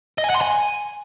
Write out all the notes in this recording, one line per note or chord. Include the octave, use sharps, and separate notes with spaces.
D#5
G#5
F#5
C6
G#5